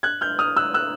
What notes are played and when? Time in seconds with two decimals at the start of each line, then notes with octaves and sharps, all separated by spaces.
0.03 F#6 G#6
0.21 F6 G6
0.39 D#6 F6
0.57 E6 F#6
0.74 E6 F#6